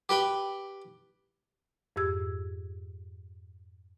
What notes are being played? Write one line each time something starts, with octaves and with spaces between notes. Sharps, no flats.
G4 B4 G5 B5
F2 G#2 G4 E6 G#6